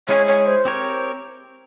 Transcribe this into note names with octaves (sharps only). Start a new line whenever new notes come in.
G#3 E4 G#4 C#5
C#5
C5
C4 G4 A#4 C#5